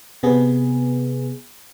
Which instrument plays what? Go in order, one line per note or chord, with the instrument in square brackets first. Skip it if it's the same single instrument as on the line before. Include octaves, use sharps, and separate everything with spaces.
[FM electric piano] C3 B3 G#4